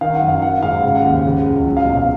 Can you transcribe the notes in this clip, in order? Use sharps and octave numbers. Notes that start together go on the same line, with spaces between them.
D#3 F5
F#5
F#2
F5
D#3 F#5
G#2 F5
C#3 F5
F#5
D#2 F5
C#3
C#2
F#3
F5
B2
F5